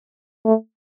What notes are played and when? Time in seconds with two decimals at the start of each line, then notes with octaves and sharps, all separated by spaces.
0.45 A3